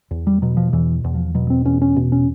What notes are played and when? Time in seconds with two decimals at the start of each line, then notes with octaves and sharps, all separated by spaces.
0.11 E2
0.27 G3
0.42 B2 F#3
0.57 F3
0.73 E2 E3
1.04 E2
1.14 F3
1.35 B2 F#3
1.50 C4
1.65 E2 C#4
1.82 C#4
1.96 B2
2.12 C#4